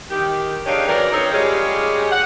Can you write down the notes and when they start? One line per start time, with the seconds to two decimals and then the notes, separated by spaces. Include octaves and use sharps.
0.11 D#3 G4
0.66 C#3 D4 D#4 G4 C#5 F5
0.88 F#2 E3 D4 A#4 C#5
1.12 C4 D#4 A4 A#4 C#5
1.32 G3 G#3 C#4 F4 G4 G#4
2.12 F#5